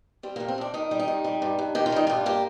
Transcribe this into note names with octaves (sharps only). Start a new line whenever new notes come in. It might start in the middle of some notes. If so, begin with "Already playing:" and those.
G3 C4
F2 A#3
C4
F2 D4
D#3 D#4
G3
D#4
F2
G3
G2
G2
D#3 G4
F4
G3 D#4
G2 F4
A#3 G4